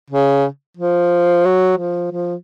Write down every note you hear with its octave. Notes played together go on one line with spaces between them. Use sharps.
C#3
F3
F#3
F3
F3